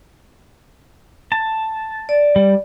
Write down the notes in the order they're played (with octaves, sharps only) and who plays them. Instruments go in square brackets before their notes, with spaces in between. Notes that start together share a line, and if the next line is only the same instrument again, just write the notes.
[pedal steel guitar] A5
[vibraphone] D5
[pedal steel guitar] G3